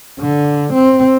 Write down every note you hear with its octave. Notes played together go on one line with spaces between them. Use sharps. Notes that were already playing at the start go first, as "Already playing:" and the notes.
D3
C4